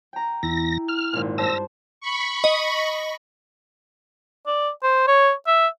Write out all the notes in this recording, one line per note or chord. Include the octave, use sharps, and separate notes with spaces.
G5 A#5
E2 E4 A#6
F6
G#1 A#2
G2 C5 A5 E6 A#6
B5 C#6
D#5
D5
C5
C#5
E5